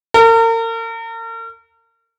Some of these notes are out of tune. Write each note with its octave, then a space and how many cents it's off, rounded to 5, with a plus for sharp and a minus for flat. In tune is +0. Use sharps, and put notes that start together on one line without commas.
A#4 -40